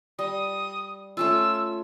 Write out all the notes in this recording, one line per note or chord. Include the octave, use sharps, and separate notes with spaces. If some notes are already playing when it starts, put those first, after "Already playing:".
G3 D#6
A3 C#4 F4 E6